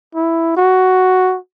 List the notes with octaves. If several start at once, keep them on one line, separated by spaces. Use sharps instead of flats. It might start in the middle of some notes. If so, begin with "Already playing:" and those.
E4
F#4